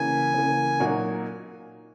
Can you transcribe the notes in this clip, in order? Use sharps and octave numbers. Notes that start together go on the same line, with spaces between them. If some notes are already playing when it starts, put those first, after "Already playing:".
Already playing: C#3 E3 A#3 G#5
C#3 E3 A#3
A#2 F#3 A#3 D#4 F#4